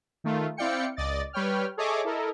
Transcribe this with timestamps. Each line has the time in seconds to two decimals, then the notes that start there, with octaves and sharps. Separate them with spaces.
0.24 D#3 A3 F4
0.57 C4 E4 D5 F5 G5 C#7
0.96 C#2 D5 D#5 A6
1.33 G3 B4 C#5 G5 F6
1.77 G#4 A4 C#5 D#5 E5 D6
2.05 E4 A4 A#4 D#5